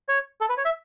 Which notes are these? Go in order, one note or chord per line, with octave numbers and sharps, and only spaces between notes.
C#5
A4
B4
C#5
E5